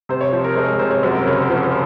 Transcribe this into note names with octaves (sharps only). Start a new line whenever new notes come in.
C3 C5
C#5
F3 C5
A#4
G#3 C5
A#4
C3 C5
C#5
F#2 C5
A#4
C#3 C#5
C5
F3 C5
C5